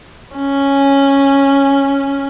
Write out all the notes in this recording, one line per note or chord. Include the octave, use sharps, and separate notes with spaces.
C#4